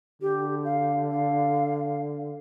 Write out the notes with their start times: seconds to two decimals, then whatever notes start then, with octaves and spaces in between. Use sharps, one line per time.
0.22 D3 G4
0.65 F5
1.11 F5